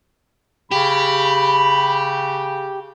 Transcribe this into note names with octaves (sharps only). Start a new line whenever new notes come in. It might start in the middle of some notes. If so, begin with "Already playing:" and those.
C#3 G4 B5